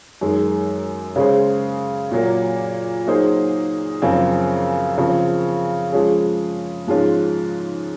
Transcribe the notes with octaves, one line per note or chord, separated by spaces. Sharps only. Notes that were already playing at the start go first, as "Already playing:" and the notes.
F#2 D#3 G#3
C#3 G#3 C#4 G#4 C5
A#2 F#3 A#3
F#3 A#3 D#4 G#4 C5
F#2 C#3 F3 C4
C#3 F3 C4
F3 G#3 C#4 G#4
G#2 F3 G#3 C#4 F4